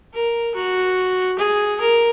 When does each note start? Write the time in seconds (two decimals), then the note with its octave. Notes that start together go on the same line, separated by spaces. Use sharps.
0.14 A#4
0.55 F#4
1.39 G#4
1.81 A#4